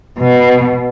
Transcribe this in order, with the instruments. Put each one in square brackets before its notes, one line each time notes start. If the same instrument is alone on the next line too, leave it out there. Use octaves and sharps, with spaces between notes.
[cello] B2